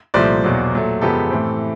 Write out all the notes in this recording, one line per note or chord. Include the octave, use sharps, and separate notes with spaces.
C2 A#2 F3 A3 C5 D5
E2 B2 F#3 A#3
A#2 F#3 A3
F#2 C#3 F3 G#3 B3 G4 A4
A2 E3 A3 C4